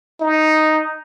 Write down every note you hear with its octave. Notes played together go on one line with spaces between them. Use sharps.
D#4